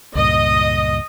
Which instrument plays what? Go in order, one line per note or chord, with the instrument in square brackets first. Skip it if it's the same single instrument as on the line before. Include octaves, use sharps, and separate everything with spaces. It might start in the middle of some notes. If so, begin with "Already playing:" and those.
[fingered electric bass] C#2 G2 A#2 [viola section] D#5